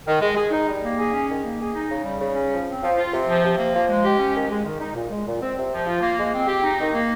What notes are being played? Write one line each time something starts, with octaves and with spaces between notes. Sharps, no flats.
D#3
G#3
G#4
D#4
G3
A#3
G#4
C#4
D#3
A#3
G#4
D#4
C#3
G3
C#3
C#4
F3
C4
F3
F4
C3
F3
C3
A#3
F3
G#3
G4
C#4
D#3
G#3
D#3
D#4
A#2
G#3
A#2
C4
C3
F3
F4
A#3
G#3
C4
G4
D#4
D#3
A#3